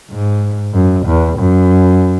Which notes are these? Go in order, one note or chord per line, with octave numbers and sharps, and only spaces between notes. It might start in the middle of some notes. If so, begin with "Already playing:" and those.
G#2
F#2
E2
F#2